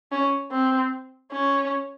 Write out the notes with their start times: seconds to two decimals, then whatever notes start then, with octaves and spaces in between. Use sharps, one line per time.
0.12 C#4
0.52 C4
1.32 C#4